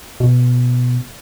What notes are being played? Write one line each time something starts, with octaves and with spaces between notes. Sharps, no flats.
B2